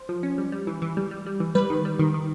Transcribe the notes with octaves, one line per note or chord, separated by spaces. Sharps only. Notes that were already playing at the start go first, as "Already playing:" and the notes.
Already playing: C5
F3
C#4
G3
G3
E3
E3
G3
G3
G3
E3
G3 B4
D#3
G3
D#3
D#3